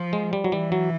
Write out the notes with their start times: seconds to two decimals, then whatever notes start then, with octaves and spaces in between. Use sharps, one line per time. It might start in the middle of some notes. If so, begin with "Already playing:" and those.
Already playing: F3
0.13 G#3
0.33 G3
0.44 F#3
0.52 E3 G3
0.72 F#3